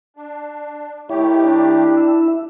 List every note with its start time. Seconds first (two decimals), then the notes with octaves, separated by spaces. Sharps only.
0.17 D4
1.10 D#3 A3 E4 G4 C#5
1.44 D4
1.97 E6